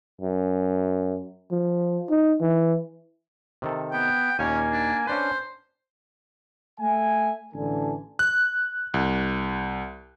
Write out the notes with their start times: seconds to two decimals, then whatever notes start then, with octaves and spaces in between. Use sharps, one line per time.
0.21 F#2
1.51 F3
2.10 D#4
2.41 E3
3.62 C3 D#3 A4
3.93 B3 G5
4.39 D#2 A#2 A#3 C#4 G#5
4.72 D4
5.07 C#4 D4 B4 C5
6.79 A3 E5 G#5
7.53 A1 D3 E3 A4 G#5
8.19 F#6
8.94 C2